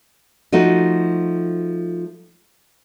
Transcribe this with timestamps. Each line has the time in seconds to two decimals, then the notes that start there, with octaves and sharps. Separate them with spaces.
0.52 F3 A3 D#4 F#4